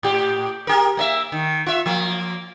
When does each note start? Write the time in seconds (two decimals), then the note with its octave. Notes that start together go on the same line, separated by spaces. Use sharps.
0.03 A2 G4
0.67 G4 A#4
0.97 A#3 D#5 E5
1.32 D#3
1.66 F4 E5
1.86 F3 A#3